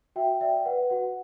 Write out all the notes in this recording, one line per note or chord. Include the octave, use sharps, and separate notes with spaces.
F#4 E5 G5
D5 E5 G5
B4 F#5
F#4 F#5